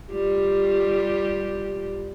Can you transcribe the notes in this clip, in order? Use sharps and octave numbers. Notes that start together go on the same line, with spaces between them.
G3 F4 G4